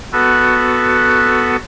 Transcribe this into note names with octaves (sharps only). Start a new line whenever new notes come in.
B3 F#4 A4 B4